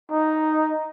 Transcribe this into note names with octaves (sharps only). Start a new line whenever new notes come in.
D#4